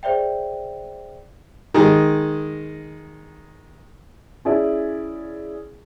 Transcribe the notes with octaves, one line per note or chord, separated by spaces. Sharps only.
G#4 C5 D5 E5 G5
D#3 G#3
C#4 E4 G#4 D5 G#5